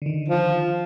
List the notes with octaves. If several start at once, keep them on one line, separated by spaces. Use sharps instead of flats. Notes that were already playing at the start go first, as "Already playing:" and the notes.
D3 D#3
F3